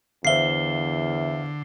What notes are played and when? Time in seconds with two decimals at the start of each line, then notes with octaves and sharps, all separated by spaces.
0.25 E2 D3 C5 E5 F5 C7 G7